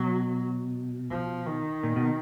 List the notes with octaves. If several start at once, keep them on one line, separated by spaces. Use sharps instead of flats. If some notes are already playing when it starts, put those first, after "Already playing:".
Already playing: B2 F#3
F3
D#3
A#2
B2